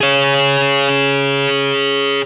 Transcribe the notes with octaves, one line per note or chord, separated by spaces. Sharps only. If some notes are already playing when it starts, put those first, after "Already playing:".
G#4 C#5